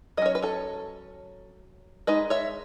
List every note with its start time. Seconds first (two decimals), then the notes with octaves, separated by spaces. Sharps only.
0.17 F#3 D#5
0.22 C#4 C#5
0.35 B4
0.42 A4 C#5
2.07 G#3 D#4 B4 D#5
2.30 C#5 E5